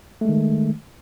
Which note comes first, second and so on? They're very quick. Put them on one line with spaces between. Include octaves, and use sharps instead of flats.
A3 G#3 D#3